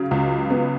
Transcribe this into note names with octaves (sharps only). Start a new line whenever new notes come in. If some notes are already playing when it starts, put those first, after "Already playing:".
Already playing: C#3 F#3
C#2
B3